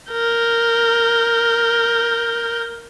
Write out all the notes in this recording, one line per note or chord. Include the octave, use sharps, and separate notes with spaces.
A#4 G6